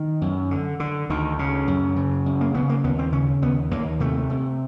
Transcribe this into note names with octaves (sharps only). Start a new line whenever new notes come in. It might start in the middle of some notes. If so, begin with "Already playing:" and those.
Already playing: D#3
F#2
D3
D3
D2 D#3
C#3
F#2
C#3
F#2
A#3
C#3 B3
A#3
D#2 B3
C4
C#3 C#4
D#2 B3
D#2 A#3
C3 A3
C3